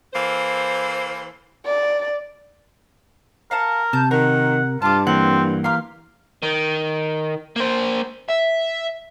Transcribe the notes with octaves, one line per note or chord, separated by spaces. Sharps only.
E3 A#3 A4 C5
D5
A#4 F5 F#5 A5
C3 A5 G6
D#3 A#4 F#5
G2 F4 A5 D6
E3 A#3 C4 F#5
G4 F5 A#5 C6
D#3
A#3 C5
E5